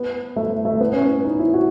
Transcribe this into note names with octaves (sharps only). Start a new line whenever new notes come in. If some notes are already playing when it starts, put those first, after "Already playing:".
Already playing: B3
A3
A3
B3
C#4
B3
D#4
E4
F#4